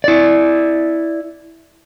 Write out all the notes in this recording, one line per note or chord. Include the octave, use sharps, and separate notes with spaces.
E4 D5